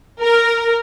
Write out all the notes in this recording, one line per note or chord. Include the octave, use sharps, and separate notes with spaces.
A#4